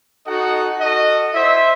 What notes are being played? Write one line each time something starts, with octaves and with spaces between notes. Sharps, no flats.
D#4 F#4 A4 D#5 F#5
F#4 A4 D#5
E4 C5 E5